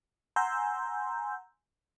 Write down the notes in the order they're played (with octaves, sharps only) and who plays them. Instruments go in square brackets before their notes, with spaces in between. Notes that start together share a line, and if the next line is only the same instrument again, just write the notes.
[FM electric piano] F#5 G#5 A#5 C6 E6 G6